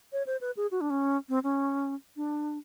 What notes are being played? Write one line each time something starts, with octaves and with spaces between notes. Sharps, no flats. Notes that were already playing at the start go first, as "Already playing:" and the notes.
C#5
C5
B4
G#4
F#4
D4
C#4
C4
C#4
D4